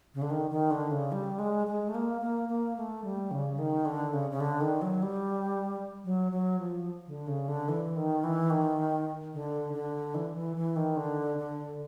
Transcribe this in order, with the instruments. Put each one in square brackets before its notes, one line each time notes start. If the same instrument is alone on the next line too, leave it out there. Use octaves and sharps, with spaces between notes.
[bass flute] C#3
D3
D#3
D#3
D3
C#3
G3
G#3
G#3
A3
A#3
A#3
A#3
A3
G3
C#3
D#3
D3
C#3
C#3
D3
D#3
F#3
G3
F#3
F#3
F3
D3
C#3
D3
E3
D#3
E3
D#3
D3
D3
E3
E3
E3
D#3
D3
D3